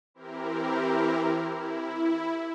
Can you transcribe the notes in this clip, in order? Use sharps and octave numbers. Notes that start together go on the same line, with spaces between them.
E3 C4 E4 G4 A#4
E4